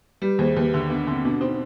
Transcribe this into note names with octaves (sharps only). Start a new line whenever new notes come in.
G3 G4 B4
D#2 G#4 C5
D#2 G4 B4
D3
B3 D4
D3 C4
B2 D4
C4 D#4